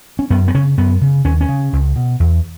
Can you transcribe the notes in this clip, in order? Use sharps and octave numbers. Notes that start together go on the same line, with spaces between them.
C#4
F#2 B3
B3
C#3 C#4
F#2 B3
C#3
D#2 C#4
C#4
C#3
C#2
B2
E2